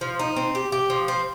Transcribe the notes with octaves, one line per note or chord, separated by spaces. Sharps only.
F3
D#4
C4
G4
G4
F3
C4